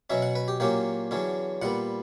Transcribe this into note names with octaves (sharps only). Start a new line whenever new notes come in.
B2 F#3 C#4 E5
F#5
B4
G4
A#2 F#3 A#3 C#4 G4
E2 D3 F#3 C#4
A#2 G3 B3 F#5